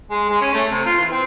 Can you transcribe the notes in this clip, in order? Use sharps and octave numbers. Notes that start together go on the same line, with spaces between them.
G#3
G#3
C#4
A3
C3
F4
E3
C4